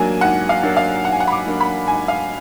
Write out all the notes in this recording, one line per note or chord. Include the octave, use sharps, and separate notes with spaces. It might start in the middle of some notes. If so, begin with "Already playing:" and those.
Already playing: G#2 F#3 A#3 D4 G#5
G#2 F#5
F5
F#3 A#3 D4
F5
G#2 F#5
G#5
F#5
B5
D6
F#3 A#3 D4
B5
G#2 G#5
F5